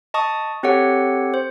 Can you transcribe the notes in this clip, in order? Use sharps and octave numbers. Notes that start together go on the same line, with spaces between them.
D#5 A5 C#6 D#6
C4 G4 A4 C#5 F#5
C5